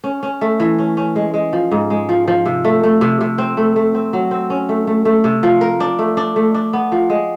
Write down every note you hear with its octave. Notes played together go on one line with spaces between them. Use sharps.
C#4
C#4
A3
E3
C#4
C#4
G#3
G#3
F3
G#2
G#3
F3
F3
C3
A3
A3
C3
C3
C4
A3
A3
C4
F#3
C4
C#4
A3
A3
A3
C3
F3
A#4
D4
A3
D4
A3
D4
B3
F3
G#3